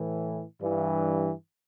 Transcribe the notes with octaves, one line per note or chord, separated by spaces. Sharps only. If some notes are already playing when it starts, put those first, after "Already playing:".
Already playing: A2 E3
G2 E3